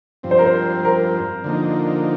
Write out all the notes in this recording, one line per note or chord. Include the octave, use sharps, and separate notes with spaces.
G2 F3 C4
C5
A#4
C5
A#4
D3 F3 A#3 D#4